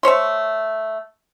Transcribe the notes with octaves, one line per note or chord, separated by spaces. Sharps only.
A3 C5 C#5 C6